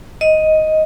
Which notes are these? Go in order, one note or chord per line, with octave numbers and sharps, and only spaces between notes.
D#5